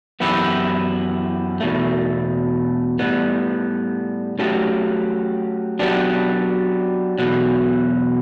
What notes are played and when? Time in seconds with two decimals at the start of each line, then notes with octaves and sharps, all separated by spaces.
0.20 F#2 E3 B3 E4 G4
1.60 E2 B2 A3
2.99 A2 G3 B3
4.39 F#3 A3 C#4 G4
5.79 F#3 B3 D4 G4
7.18 E2 B2 F#3